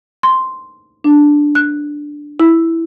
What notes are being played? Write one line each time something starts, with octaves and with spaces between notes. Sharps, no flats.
C6
D4
F#6
E4